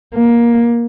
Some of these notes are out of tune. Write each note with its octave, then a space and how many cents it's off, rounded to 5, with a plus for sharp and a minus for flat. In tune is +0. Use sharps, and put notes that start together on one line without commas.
A#3 +15